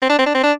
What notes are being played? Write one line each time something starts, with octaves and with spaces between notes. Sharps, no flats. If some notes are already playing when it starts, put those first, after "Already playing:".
C4
D4
C4
D4
C4
D4